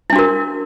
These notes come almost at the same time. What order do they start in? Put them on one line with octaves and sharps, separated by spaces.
E4 D4 F#4 A#4